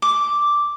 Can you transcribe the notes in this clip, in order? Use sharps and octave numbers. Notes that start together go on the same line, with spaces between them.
D6